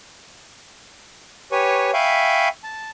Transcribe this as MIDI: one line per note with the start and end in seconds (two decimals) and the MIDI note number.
1.52 1.91 67
1.52 1.91 71
1.52 1.91 73
1.52 1.91 80
1.52 1.91 85
1.94 2.48 76
1.94 2.48 77
1.94 2.48 79
1.94 2.48 80
1.94 2.48 83
1.94 2.48 85
2.64 2.91 81